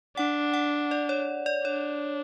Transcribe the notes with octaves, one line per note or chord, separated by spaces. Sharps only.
D4 F#5
F#5
D5
C#5
D5
D4 C#5